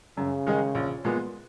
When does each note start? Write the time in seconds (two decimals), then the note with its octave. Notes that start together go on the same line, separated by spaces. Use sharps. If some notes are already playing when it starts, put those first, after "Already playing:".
0.17 F#2 C#3
0.47 D#3 G#3 D#4 G#4
0.75 A#1
1.05 A#2 G#3 B3